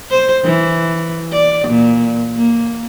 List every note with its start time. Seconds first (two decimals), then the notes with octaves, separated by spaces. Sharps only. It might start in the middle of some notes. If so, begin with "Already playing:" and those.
0.11 C5
0.44 E3
1.32 D5
1.68 A#2
2.37 A#3